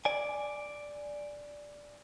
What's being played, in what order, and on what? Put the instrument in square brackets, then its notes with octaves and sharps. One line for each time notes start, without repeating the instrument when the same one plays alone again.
[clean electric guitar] D5 G#5